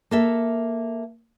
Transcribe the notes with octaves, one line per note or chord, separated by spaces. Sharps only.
A#3 A4 E5